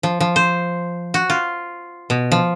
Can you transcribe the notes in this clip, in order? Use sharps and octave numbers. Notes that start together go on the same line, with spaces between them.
F3
F3
C5
F#4
F4
B2
F3